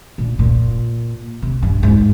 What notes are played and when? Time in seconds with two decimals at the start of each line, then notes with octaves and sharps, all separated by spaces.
0.18 A#2
0.39 A#2
1.42 C3
1.62 G2
1.83 G#2